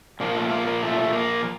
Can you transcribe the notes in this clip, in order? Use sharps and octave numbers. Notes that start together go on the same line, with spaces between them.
A#2 F3 A#3
A3
A#3
A#3
A3
A#3